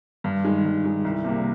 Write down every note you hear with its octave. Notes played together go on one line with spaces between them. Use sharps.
G2
D#3 G#3
G2
D#3 G#3
C2
C3 G3 A#3